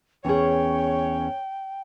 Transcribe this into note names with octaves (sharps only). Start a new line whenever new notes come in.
E2 C#4 G#4 C#5 G5